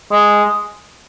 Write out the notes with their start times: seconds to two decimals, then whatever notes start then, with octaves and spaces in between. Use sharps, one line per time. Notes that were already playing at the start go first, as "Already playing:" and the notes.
0.11 G#3